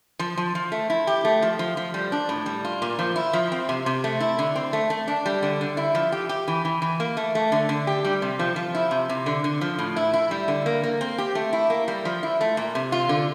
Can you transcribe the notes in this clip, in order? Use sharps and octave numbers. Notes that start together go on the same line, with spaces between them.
F3
F3
F3
A3
E4
G4
A3
F3
F3
F3
G3
D4
A2
G3
F4
A#2
F3
E4
F3
C4
C3
C3
A3
E4
D3
C4
A3
A3
D4
G3
D3
D3
E4
F3
G4
G4
E3
E3
E3
A#3
A3
A3
D3
D3
G4
G3
C3
F3
F3
E4
C3
C3
D3
D3
F3
A2
E4
E4
G3
D3
A#3
A#3
C4
G4
A3
E4
A#3
G3
F3
E4
A3
A#2
C3
F4
D3